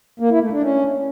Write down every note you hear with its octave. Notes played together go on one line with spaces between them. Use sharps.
A#3
E4
A3
D4
C#4